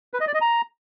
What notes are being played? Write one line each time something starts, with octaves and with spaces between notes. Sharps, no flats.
B4
D#5
D5
D#5
A#5